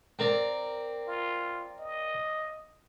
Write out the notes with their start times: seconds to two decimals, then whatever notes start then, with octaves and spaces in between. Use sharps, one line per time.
0.19 C4 A#4 D5
1.07 F4
1.79 D#5